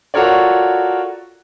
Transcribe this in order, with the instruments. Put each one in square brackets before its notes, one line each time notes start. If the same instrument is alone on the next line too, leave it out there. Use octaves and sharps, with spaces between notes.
[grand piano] F4 F#4 A4 A#4 C#5 D5